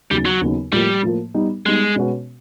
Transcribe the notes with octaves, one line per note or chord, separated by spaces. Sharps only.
D#2 C#3 F#3 G3 B3 D#4
F#3
D#2 C#3 F#3 B3 D#4
A2 F3 G3 A#3
A2 F3 A#3
G3 B3 D#4
G3 G#3 B3 D#4
B2 G#3 C#4 F#4 B4